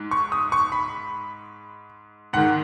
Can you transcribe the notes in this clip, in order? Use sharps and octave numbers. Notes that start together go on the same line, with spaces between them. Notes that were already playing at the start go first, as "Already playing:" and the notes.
Already playing: G#2
C#6
D#6
C#6
B5
G#2 D#3 F#5